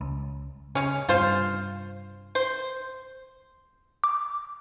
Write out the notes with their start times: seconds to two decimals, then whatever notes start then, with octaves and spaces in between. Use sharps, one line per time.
0.01 C#2
0.75 C#3 G#3 C#4
1.09 G2 C3 F4 C5 F5
2.35 C5
4.04 D6